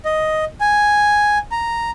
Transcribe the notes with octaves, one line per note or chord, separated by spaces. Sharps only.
D#5
G#5
A#5